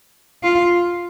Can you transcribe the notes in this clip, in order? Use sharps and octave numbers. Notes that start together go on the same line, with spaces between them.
F4